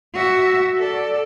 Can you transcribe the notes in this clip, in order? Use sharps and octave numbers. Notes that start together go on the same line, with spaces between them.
F#4 E5
A4 D5